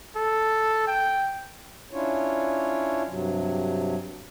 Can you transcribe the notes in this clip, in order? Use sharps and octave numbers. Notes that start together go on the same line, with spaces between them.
A4
G5
C#4 D4 E4 F4 C#5
G2 C3 F#3